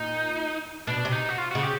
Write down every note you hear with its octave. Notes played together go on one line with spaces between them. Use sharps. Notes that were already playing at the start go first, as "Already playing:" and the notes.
Already playing: A#2 D#4
B2 D4
C3
D#4
F#4
F4
C#3 F#4
G4